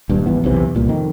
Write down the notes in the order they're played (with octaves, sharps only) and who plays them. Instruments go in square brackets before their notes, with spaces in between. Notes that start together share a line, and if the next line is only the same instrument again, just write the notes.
[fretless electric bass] D#1 G2
G#1 E3 B3
B1 E2 C3 E3
C2 A#2
F2 D#3